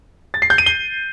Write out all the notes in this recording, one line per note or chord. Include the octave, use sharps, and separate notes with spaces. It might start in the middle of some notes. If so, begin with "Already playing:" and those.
A6
C7
G6
D#7
G7